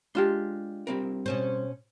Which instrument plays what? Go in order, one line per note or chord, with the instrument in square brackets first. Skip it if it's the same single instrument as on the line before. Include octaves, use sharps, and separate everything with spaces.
[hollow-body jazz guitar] G#3 A5 C6 [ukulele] D4 F4 G4
[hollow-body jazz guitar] G3 C4 A#4
[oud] B2 C#4 C5